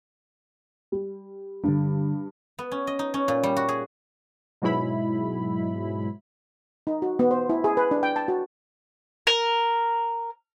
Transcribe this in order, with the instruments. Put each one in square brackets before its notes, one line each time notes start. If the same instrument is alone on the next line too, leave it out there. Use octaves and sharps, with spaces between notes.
[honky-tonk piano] G3
[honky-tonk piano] G2 [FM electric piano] D3 G3
[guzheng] B3
C#4
D#5
D#4
C#4
A#2
G3
F#4
G#4
[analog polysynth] G#2 B2 F#3 G#3 E4 B5
[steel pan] D#4
F#4
B3
C5
E4
G#4
B4
D4
G5
A5
F#4
[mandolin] A#4